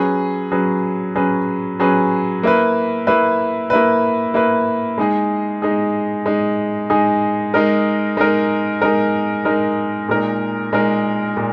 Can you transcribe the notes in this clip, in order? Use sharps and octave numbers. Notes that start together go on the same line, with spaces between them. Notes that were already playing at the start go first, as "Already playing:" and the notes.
Already playing: F#3 C#4 G#4 B4
F#3 C#4 G#4 B4
F#3 C#4 G#4 B4
F#3 C#4 G#4 B4
A#3 E4 B4
A#3 E4 B4
A#3 E4 B4
A#3 E4 B4
G#3 D#4 G#4
G#3 D#4 G#4
G#3 D#4 G#4
G#3 D#4 G#4
G#3 D#4 A#4
G#3 D#4 A#4
G#3 D#4 A#4
G#3 D#4 A#4
A#2 G#3 D#4 A#4
A#2 G#3 D#4 A#4
A#2 G#3